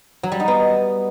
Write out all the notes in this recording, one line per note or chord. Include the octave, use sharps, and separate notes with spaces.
F#3
G3
D#4
B3